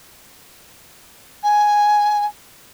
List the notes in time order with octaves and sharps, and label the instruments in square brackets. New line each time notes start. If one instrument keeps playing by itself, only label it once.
[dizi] G#5